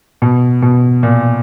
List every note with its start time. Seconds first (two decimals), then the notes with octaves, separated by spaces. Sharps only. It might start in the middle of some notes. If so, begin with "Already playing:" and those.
0.22 B2
0.62 B2
1.03 A#2